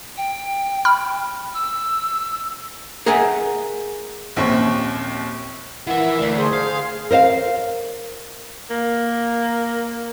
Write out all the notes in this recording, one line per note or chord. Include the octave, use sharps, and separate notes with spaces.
G5
B5 F6
E6
G#4 A#4 E5 F#5 G#5
A#1 D#2 C4 C#4 C#6
E3 A#4 E5 F#5
D2 D5
G#4 C5
C5 F5
A#4 C5 D#5 F5
A#3